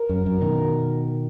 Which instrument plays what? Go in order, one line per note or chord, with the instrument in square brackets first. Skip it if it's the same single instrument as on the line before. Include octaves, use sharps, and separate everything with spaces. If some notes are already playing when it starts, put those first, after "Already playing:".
Already playing: [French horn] A#4
[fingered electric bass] F#2
F#2
B2 D#3